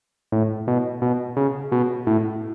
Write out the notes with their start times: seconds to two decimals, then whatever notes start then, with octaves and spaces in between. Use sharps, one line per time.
0.32 A2
0.67 B2
1.02 B2
1.37 C#3
1.72 B2
2.07 A2